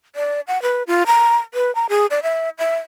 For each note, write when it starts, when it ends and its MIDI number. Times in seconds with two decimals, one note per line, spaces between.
0.16 0.41 74
0.48 0.61 78
0.62 0.83 71
0.87 1.03 65
1.07 1.37 82
1.54 1.74 71
1.75 1.86 82
1.89 2.06 68
2.11 2.20 74
2.23 2.49 76
2.59 2.76 76